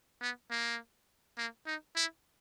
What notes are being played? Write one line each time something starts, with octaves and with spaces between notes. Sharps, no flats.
B3
A#3
A#3
D#4
E4